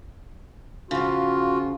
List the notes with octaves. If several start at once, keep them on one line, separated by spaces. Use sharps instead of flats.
C#3 F3 F4 F#4